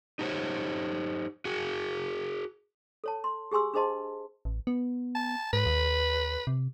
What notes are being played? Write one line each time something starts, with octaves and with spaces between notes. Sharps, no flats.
D#4 G4 A4 C5 C#5
F#4 G#4
A4 C#5 A5
C6
G4 G#4 G#5 C6 E6
D4 G#4 C5 D#5 A5 C6
A1
B3
A5
G#2 B4
D#2
C3